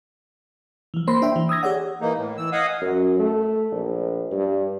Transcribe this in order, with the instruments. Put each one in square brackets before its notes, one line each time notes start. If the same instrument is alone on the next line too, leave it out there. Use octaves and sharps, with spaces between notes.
[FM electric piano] E3 F3
A#3 C5 B5 C6
D4 E5 G5
E3
D#6 E6 G#6 A#6
G4 G#4 C#5 D5 F#5
[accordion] E3 A#3 D#4
A2
E3 E6
D#5 F5 F#5 G#5 D#6
[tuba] F#2
A3
A#1
G2